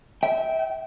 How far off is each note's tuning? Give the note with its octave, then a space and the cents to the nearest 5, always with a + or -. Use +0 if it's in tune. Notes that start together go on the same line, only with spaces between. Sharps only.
E5 -30 G5 -15